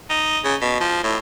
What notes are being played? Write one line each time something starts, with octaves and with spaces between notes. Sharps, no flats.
D#4
C#3
B2
F3
A2